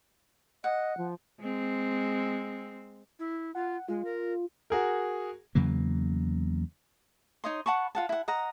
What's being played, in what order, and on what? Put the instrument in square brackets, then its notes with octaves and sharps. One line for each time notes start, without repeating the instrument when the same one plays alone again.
[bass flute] D#5 [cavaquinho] F#5
[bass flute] F3
[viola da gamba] G#3 C4
[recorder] E4
[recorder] F4 [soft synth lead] F#5
[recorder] G#3 [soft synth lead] F4
[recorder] A#4
[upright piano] F#4 G#4 A#4
[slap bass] E2 C#3 F#3 A#3
[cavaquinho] D#4 C#5 D#5 C6
F#5 A5 B5 C#6
F4 F#5 A5
E4 F#5
D#5 F#5 A#5